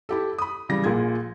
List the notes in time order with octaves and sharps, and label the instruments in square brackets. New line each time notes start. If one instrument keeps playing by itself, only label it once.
[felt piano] E4 G4 A4
B5 D#6
C#3 E3 G3 A#6
A#1 A#2 A#3 G#4 G#6